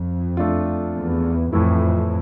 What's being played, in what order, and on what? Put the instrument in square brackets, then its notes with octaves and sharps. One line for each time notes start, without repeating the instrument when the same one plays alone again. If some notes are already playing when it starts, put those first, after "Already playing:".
Already playing: [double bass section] F2
[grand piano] A3 D4 F4
[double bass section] E2
[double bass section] F2 [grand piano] A2 E3 A3 E4